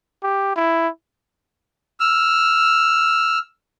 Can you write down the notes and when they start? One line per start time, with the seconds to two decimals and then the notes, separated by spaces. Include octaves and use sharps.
0.23 G4
0.56 E4
2.00 E6 F6